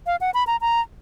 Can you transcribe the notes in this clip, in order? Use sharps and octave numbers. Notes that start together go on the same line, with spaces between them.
F5
F#5
B5
A#5
A#5